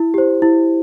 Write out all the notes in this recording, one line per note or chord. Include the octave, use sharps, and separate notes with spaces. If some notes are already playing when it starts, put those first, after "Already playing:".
Already playing: E4
G4 C5
E4